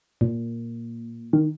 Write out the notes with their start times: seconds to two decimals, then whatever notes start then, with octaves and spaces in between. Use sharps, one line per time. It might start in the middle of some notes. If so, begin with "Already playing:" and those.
0.21 A#2
1.33 D#3